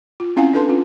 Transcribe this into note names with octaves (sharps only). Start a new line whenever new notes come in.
F4
C4 C#4 E4 F5 F#5 G#5
D4 E4 A4 B4 A5 C6
C#4 F4